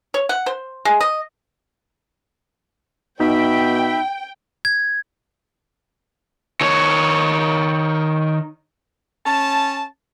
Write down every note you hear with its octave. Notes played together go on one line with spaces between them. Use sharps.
C#5
F#5
C5
G#3
D#5
B2 D#4 E5 G5 B5
G#6
D#3 C#5
C#4 A5